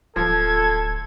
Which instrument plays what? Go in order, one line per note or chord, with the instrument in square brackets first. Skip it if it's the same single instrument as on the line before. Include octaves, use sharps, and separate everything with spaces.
[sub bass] D1 [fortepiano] F3 [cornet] A4 [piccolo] G#6